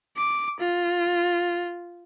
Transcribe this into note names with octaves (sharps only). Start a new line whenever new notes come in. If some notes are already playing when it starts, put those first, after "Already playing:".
D6
F4